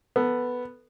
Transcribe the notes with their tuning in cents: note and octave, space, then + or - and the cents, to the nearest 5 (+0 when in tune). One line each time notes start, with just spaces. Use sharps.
B3 +0 A4 +20